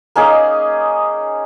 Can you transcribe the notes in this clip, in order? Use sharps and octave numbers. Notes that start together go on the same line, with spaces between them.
A#3 C#4 D#4 G#4